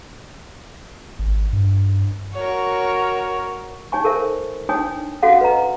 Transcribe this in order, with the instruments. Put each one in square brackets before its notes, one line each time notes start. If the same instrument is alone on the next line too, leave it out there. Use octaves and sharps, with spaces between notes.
[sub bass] G#1
G2
[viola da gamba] F#4 A#4 [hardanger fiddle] C#5
[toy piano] D#4 C#5 G#5 C#6
A4 A#4 C5 E5
D4 D#4 C#5 G5 G#5 D#6
C#4 F#4 A4 F5 F#5
B4 D#5 A#5